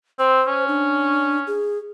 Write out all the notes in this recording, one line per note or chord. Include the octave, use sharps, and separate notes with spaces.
C4 C5
C#4
D4
G#4